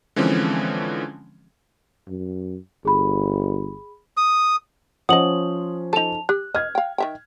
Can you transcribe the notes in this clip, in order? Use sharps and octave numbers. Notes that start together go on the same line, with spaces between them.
D3 E3 F3 G#3 C4 C#4
F#2
G1 G#4 B5
D#6
F3 C#4 C5 D#5 F#5 D#6 F#7
D#4 A4 A5 F7
G4 F#6
D#5 F6 G#6
F5 G5
D#3 E5 G5